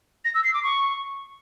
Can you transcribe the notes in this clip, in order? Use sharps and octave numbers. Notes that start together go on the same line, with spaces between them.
A#6
E6
C7
D6
C#6